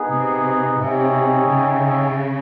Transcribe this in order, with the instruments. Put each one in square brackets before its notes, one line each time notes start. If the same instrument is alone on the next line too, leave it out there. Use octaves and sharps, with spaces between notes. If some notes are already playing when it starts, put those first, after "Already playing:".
Already playing: [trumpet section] B3 D#4 G#4
[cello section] C3
[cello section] C3 [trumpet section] D#4 G#4 C#5 E5 G5
[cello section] C#3